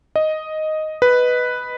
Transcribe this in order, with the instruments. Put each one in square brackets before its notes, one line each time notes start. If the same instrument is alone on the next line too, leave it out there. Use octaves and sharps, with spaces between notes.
[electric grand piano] D#5
B4